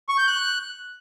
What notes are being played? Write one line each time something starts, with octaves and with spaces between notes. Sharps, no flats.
C#6
G6
F#6